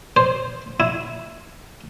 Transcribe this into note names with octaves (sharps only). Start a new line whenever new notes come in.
C5
E4